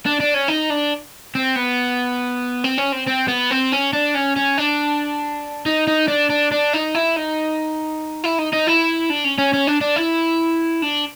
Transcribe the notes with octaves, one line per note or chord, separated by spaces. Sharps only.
D4
D4
C#4
D#4
D4
C4
B3
C4
C#4
C4
C4
B3
C4
C#4
D4
C#4
C#4
D4
D#4
D#4
D4
D4
D4
D#4
E4
D#4
E4
D#4
D#4
E4
D4
C#4
C#4
C#4
D4
D4
E4
D4